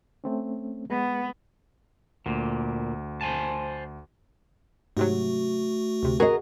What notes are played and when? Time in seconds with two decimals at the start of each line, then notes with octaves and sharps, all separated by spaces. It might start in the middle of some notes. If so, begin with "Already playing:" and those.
0.24 A3 C4 C#4
0.90 G#3 B3
2.26 D2 A#2
3.21 C5 G#5 A5
4.97 G#2 C3 F#3 A3 F#4
6.03 D2 C3
6.20 F#4 G#4 A#4 D#5